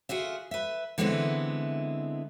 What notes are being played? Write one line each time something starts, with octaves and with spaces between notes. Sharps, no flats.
F4 F#4 G#4 E5
B4 E5
D3 E3 G#3 B3 C4 E4